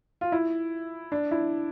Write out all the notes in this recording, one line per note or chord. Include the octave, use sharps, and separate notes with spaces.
F4
E4
D4
E4